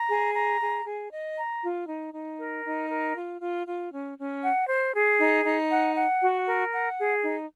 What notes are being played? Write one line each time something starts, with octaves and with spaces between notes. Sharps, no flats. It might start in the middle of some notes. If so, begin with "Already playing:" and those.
Already playing: A#5
G#4
A#5
G#4
G#4
D#5
A#5
F4
D#4
D#4
A#4
D#4
A#4
F4
F4
F4
C#4
C#4
F#5
C5
G#4
D#4
D#4
F#5
F#5
F#4
A#4
F#5
G#4
D#4